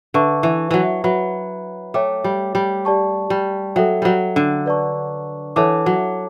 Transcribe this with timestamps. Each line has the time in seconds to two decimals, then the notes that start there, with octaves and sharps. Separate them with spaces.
0.14 D3 B4 E5 A5 C#6
0.43 E3
0.71 E3 F#3
1.04 F#3 B4 E5 B5
1.94 A3 C#5 G5 D6
2.24 G3
2.55 G3
2.85 G4 D5 A5 C#6
3.30 G3
3.76 F#3 A4 E5 G5
4.02 F#3 G3
4.36 D3
4.66 B4 D5 A5 C#6
5.56 E3 A4 C#5 F#5 A5 D6
5.86 F#3